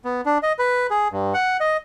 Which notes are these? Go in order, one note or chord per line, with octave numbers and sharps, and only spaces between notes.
B3
D4
D#5
B4
G#4
G2
F#5
D#5